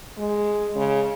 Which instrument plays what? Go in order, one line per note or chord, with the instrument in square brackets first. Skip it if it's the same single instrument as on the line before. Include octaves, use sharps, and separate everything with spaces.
[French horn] G#3
C#3